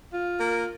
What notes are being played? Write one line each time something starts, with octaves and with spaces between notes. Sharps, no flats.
F4
A#3